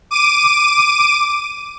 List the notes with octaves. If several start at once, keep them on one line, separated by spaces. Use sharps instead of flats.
D6 D#7